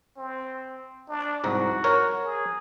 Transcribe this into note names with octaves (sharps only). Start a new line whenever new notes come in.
C4
D4
C2 G#2 F#4 A#5
A#4 C#5
G#4